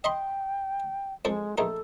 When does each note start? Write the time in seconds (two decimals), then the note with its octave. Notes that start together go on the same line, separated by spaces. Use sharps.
0.04 D#5 G5 B5 C6
1.25 F2 F3 G#3 A4
1.58 A#1 A3 D#4 A4